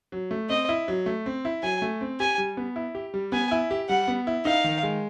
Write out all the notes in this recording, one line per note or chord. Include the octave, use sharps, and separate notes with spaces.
F#3
A3
C4 D#5
E4
F#3
A3
C4
E4
F#3 G#5
A3
C4
G4 G#5
G3
B3
E4
G4
G3
B3 G#5
E4
G4
G3 F#5
B3
E4
D#4 F5
D#3
G#3